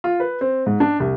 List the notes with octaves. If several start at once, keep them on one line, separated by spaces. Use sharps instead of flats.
F4
B4
C4
G#2
D4
C2